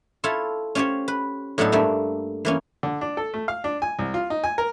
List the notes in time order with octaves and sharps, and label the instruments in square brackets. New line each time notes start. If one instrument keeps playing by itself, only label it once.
[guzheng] E4 F4 A4 C#5 E5
C#4 F4 G4 C5 C#5
B4
A2 F#3 B3 D4 D#4 A4
G2 A3 A#3 E5
E3 A#3 C#4
[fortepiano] D3
D4
A4
A3
F5
D4
G#5
C2
F4
D#4
G#5
A#4